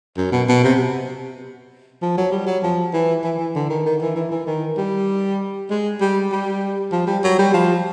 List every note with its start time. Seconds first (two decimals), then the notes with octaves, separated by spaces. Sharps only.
0.17 F#2
0.32 B2
0.49 B2
0.64 C3
2.02 F3
2.17 F#3
2.32 G3
2.47 F#3
2.63 F3
2.94 E3
3.24 E3
3.39 E3
3.55 D3
3.70 D#3
3.86 D#3
4.02 E3
4.16 E3
4.32 E3
4.47 D#3
4.77 G3
5.70 G#3
6.01 G3
6.32 G3
6.92 F3
7.07 G3
7.24 F#3
7.39 G3
7.54 F3